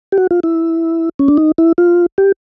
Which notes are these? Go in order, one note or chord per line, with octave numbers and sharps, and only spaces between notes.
G4
F#4
F4
E4
C#4
D4
D#4
E4
F4
G4